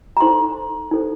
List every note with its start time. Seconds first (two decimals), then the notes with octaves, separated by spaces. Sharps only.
0.17 A#5
0.20 D#4 A4 C5 C6
0.91 D#4 A4 C5